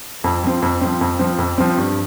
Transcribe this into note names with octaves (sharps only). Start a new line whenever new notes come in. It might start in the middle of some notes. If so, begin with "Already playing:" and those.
F2
F3 C4
F2
F3 C4
F2
F3 C4
F2
F3 C4
G2